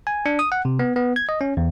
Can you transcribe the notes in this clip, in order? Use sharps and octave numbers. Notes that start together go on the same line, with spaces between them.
G#5
D4
D#6
F#5
C3
B3
B3
G#6
D#5
C#4
E2